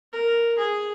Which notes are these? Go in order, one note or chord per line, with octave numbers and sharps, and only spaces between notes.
A#4
G#4